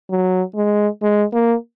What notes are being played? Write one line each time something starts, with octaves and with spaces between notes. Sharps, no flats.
F#3
G#3
G#3
A#3